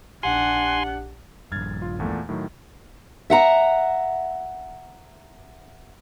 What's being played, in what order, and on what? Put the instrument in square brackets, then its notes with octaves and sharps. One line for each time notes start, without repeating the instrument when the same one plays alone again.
[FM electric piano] A#1 G4 [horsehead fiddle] D4 F#5 [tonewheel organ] G#5 C6
[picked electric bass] A#1 G2 [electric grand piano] F6 G#6 A6
[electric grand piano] F4
E2 A#2 A3
A2 D#3 F#3
[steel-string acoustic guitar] E5 F#5 A#5